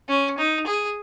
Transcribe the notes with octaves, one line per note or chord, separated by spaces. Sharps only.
C#4
D#4
G#4